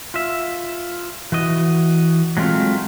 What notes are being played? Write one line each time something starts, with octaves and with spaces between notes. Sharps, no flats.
F4 E5
E3 F#4 D#5
F#3 G#3 A3 C4 F4